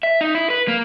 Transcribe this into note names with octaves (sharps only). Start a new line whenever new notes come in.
E5
D#4
E4
B4
A#3